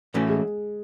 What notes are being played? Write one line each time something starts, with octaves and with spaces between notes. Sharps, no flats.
A2 E3 A3 C#4 F#4
G#3